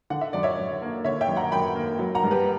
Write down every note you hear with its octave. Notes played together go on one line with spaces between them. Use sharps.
D3 F#5
E5
F#2 D5
C#5 E5
F#2
A#3
D3 C#5 E5
E5 G5
F#2
F#5 A#5
F#2 G5 B5
A#3
F#3
F#5 A#5
G2
G4 B4